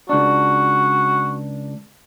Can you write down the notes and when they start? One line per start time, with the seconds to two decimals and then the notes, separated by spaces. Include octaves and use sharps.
0.09 C#2 D4 F#4